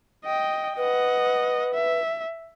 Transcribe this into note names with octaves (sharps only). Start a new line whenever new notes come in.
D#5 G5
B4 D#5 F#5
E5